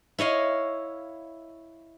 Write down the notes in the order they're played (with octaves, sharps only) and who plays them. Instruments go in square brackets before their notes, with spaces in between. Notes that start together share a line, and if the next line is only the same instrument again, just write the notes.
[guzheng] E4 C#5 D#5 F5